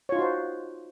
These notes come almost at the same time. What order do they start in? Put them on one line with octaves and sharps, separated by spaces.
C#5 F4 D#4 F#4 C5